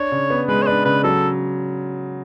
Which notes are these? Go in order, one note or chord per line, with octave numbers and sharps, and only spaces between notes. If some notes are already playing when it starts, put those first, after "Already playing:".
Already playing: D4 C#5
C#3
B3
G#3 B4
C#5
D4 B4
C#3 B4
F#3 A4